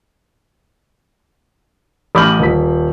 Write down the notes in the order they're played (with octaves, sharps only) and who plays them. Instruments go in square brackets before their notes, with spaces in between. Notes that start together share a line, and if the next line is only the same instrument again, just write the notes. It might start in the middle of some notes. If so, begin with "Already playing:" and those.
[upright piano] A1 B5 D6 F6 G6 F#7
D#1 B6